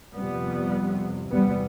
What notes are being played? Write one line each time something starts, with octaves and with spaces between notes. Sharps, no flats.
F2 C3 G3 B3
E2 C3 G3 B3